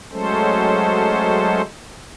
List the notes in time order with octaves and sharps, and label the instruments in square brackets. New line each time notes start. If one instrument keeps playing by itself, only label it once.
[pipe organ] F#3 G#3 A3 C#4 A4 C5